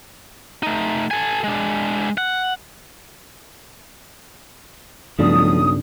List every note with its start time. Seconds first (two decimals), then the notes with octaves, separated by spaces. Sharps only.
0.63 A3 D#4
1.11 A4 G#5
1.44 G#3 D4
2.18 F#5
5.19 B1 G2 C#3 F3 A3 D4 D#6